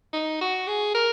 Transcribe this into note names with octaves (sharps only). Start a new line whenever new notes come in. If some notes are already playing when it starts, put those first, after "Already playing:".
D#4
F#4
G#4
A#4